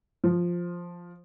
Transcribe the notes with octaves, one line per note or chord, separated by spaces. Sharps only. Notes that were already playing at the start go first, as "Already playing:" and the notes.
F3